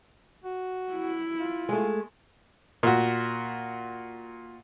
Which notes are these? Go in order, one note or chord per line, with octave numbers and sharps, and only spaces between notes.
F#4
E4
F4
G#3 A3
A#2 F#4